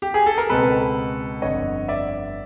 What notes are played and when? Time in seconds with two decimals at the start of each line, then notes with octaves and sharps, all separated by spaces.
0.02 G4
0.14 G#4
0.26 A4
0.38 A#4
0.50 C#2 B2 G#3 C4 A4 B4
1.42 G1 F2 D3 C#5 D#5
1.88 D5 E5